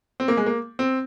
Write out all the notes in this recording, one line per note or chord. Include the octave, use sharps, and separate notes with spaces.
C4
A#3
G#3
A#3
C4